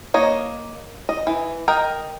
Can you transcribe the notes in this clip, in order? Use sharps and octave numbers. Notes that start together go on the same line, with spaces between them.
A#3 C#5 D#5
D#5
E3
A#4 D#5 G5